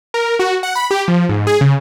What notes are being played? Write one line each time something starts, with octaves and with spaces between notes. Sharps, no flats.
A#4
F#4
F#5
B5
G4
F3
G#2
G#4
C#3